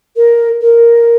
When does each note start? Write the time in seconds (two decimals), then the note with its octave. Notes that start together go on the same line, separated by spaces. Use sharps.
0.16 A#4
0.61 A#4